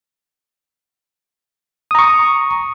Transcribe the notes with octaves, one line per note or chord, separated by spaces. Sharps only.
A#5 C#6 D#6